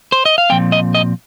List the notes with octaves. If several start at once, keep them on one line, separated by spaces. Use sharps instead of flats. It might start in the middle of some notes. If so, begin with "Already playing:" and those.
C5
D#5
F5
A#2 F3 C4 G5
D#5
D#5